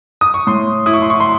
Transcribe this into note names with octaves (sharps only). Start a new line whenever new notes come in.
D#6
C#6
A2 C6
E4 D#6
C#6
C6
C#6
C6